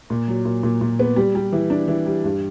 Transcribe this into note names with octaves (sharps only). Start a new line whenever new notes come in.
A#2
F#3
A#2
A#2
A#2
B3
G3
G3
E3
D4
E3
G3
G2